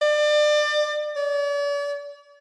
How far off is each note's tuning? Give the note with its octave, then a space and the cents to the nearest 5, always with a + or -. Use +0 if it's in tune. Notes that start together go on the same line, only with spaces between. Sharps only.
D5 +30
D5 -45